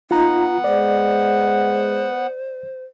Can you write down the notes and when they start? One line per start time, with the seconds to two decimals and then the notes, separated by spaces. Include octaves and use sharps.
0.11 B3 D#4 F4 F#5 A#5
0.64 G#3 C5 D5